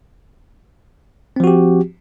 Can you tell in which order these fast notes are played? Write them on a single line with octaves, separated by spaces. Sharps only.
C4 F3 F#4 G4